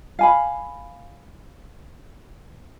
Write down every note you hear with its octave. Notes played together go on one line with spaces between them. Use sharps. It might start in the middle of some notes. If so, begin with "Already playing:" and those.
F5 G#5 B5